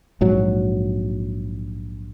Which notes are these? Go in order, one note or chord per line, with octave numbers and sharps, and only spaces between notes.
A#1 G#2 F#3